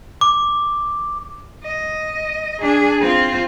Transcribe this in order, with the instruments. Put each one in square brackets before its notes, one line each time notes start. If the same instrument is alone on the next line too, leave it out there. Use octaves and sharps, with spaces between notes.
[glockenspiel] D6
[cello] D#5
D4 G#4
C4 F4